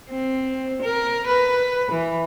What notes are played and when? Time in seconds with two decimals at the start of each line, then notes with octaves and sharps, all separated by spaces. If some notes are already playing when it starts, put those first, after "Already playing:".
0.10 C4
0.83 A#4
1.27 B4
1.92 E3